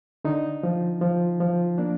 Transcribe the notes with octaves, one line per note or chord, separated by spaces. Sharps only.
D3 D#4
F3
F3
F3
A#3 D4